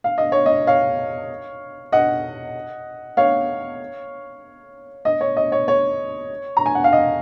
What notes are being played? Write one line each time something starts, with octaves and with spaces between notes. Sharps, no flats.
F5
D#5
C#5
D#5
C#5 F5
D#5 F#5
C#5 F5
D#5
C#5
D#5
C#5
C#5
A#5
G#5
F#5
F5
D#5